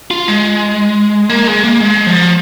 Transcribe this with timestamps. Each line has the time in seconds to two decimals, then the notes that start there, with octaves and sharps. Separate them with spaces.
0.11 F4
0.28 G#3
1.29 A#3
1.47 G#3
1.64 A#3
1.80 G#3
2.07 F3